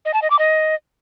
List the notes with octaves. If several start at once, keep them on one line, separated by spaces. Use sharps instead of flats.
D#5
A5
D#5
D6
D#5